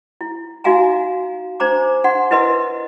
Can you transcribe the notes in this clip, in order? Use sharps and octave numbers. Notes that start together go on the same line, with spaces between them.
E4
D#4 F#4 E5 F5 G#5 A#5
D4 C5 A#5 D6
D4 F#5 C6
E4 A#4 B4 D#5 E5 C6